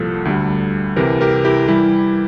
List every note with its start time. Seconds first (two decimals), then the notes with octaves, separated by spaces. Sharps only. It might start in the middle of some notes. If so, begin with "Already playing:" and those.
Already playing: C2 A#2 F3 A4
0.25 D2 D3 G3
0.96 C2 C3 E3 G4 A#4
1.21 G4 A#4
1.45 E4 G4
1.68 E3 G3 E4 G4